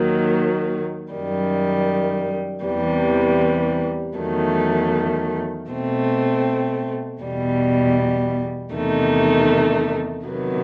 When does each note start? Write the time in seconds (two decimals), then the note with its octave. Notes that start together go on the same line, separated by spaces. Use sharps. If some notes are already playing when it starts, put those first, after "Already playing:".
Already playing: D#2 D#3 F#3
1.12 F#2 D#3 G3
2.64 E2 C3 E3 G3
4.17 E2 D#3 F#3 A3
5.69 B2 A3 C4
7.21 E2 B2 G3
8.73 E2 C3 D#3 A3 D#4
10.25 C3 D#3 F#3 B3